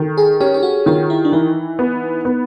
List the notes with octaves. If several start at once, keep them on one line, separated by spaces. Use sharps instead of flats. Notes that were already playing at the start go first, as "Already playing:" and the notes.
Already playing: D#3 A4
G#4
C#4 G4
G4
F#4
D#3 F4
E4
D4
E3 D#4
B3
B3